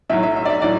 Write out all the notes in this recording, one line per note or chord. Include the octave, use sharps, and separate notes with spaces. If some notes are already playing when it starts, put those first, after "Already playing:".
B1 A2 F#3 E5
E5
E5
D5
E5
A2 F#3 D5